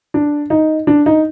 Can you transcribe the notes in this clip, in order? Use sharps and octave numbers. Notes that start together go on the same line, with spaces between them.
D4
D#4
D4
D#4